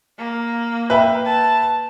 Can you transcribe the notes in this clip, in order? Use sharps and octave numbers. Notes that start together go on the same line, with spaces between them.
A#3
B4 E5 G5
A5